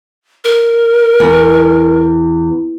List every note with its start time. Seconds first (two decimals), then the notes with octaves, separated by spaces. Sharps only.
0.44 A#4
1.20 E2